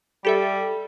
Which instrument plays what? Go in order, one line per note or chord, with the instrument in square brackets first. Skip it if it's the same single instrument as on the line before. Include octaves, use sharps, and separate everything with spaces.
[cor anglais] G3 [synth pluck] G4 A4 E5